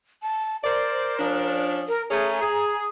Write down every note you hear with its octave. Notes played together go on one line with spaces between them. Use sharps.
A5
A#4 C5 D5
F3 C#4 D4
A#4
A3 C#4 G#4 A#5
G#4